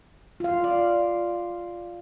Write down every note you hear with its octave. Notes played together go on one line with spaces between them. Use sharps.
F4 F5
D5